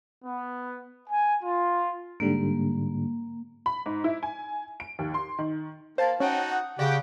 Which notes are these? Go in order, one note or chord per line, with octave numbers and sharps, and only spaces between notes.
B3
G#5
F4
G#2 D3 G3 A#3
B5
G#2
E4
G#5
D7
D#2
C6
D#3
A#3 C5 F5 G#5 A5 B5
C#4 D#4 F#4 E5 F#5 G5 A5
F#5 D#6
C#3 F#4 G4 D5 F#5 G5